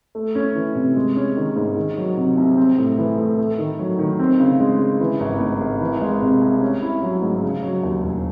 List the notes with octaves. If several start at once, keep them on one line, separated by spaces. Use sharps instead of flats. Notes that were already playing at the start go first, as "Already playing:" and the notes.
A3
C#4
E3
C3
G#3
C#4
D#3
G#2
D#3
F#3
C3
C2
C4
A2
E3
A2
A3
D#3
F#3
D#3
C4
C#3
G#3
C#3
E3
G#1
G#2
G#1
E3
G#3
C3
C2
C#4
E4
F#3
G#2
C#3
F#3
D#2
E1